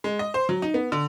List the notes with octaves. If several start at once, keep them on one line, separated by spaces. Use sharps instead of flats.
G#3
D#5
C5
F#3
D#4
B3
D3